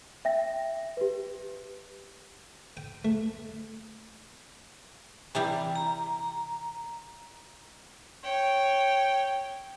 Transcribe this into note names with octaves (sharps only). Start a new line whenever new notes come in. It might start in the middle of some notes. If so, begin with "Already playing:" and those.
E5 G5 A#6
G4 B4
G5
A3
C3 E3 G3
A#5
C#5 G5